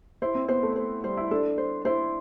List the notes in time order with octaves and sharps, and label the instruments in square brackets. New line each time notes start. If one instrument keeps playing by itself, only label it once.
[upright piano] E4 [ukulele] C5
[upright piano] C4
[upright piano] B3 [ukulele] C5
[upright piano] A3
[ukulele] C5
[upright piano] G3 [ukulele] C5
[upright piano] E4
[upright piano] D4 [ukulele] A4
[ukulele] C5
[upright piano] E4 [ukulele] C5